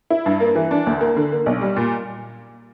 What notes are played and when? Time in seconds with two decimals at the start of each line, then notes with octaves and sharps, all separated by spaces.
0.10 E4
0.26 G2
0.40 A#3
0.55 E3
0.71 D4
0.87 D2
1.01 A#3
1.16 D3
1.32 A#3
1.46 B1
1.61 G3
1.76 A#2